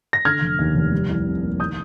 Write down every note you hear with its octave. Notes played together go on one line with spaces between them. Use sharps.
A#6
D3 F6 G#6
F1
D#2
F1
G3
C2
C3
A#3
D#3 D#6 G6